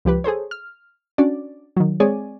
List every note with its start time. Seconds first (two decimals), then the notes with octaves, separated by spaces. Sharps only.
0.05 C#2 F3 G4 B4
0.24 G#4 A4 C5 C#5
0.51 F6
1.18 C#4 D4 F#4 D5
1.76 D#3 F#3
2.00 G#3 C4 G#4 C#5 D5 G#5